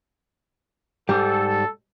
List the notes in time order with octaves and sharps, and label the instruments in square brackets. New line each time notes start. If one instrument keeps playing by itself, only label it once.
[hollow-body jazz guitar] G#2 G3 [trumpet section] A4